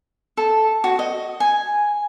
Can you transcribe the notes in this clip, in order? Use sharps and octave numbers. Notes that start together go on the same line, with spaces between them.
A4
F#4
D#5
G#5